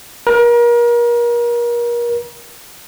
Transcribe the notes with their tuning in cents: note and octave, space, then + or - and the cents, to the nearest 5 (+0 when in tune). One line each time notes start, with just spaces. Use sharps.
A#4 +35